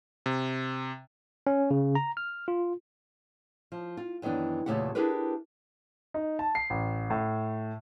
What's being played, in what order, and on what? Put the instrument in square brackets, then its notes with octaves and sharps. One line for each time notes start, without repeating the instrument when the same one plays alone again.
[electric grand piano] C3
[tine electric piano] C#4
C#3
A#5
F6
F4
[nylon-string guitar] F3
F4
F#2 D#3 E3 B3 D4
E2 A#2 C#3 A3 G4 F#5
D4 E4 G4 G#4 A#4 B4
[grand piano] D#4
A5
C7
A1
A2